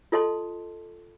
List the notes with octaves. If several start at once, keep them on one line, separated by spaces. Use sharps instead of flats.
F4 A4 D#5 A5 C6